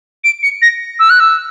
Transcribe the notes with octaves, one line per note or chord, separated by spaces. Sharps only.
D7
C#7
A#6
E6
F#6
E6